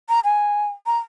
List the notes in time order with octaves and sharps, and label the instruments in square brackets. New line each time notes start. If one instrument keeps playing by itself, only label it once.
[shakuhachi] A#5
G#5
A#5